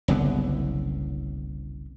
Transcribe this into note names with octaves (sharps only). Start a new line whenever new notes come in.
F#1 C2 D3 B3